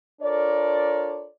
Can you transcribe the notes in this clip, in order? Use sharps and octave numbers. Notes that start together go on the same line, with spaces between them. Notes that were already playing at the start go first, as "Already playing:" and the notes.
D4 F4 A4 A#4 C#5 D5